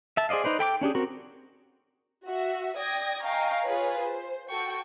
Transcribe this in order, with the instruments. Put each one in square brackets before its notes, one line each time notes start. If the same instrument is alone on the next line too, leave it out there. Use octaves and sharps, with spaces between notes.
[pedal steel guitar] E5 A5
G#4 C5 D5 D#5 F5
D#4 B4 C5 D5
A4 G5 B5 D6
C#4 D4 G4 G#4
C4 F#4 A#4
[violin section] F#4 E5
D5 G5 D#6 G#6 A#6
D#5 F5 G5 G#5 A#5 C#6
F4 G#4 B4 C#5
C5
F#4 A4 G5 C#6